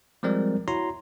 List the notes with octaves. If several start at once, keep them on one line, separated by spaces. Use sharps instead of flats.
F3 G3 G#3 C4 A#4 D5
E4 F#4 C#5 A#5 C6